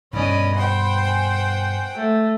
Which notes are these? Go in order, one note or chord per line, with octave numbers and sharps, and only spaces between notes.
G2 B2 C#4 D5 D#5 B5
C5 F#5 G5
G#5
A3